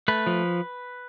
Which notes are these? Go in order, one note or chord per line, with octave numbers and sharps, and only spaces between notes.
A3 B4
F3